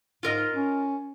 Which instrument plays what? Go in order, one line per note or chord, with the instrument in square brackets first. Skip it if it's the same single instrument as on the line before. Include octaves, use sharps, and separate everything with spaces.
[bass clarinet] G#2 [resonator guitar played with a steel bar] F4 A#4 D#5
[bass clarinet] C#4